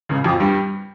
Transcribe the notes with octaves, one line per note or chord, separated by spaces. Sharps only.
C#2 C#3
F2 F3
G2 G3